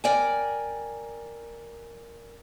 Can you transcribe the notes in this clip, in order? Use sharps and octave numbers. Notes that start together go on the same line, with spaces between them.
A#4 D5 G5 G#5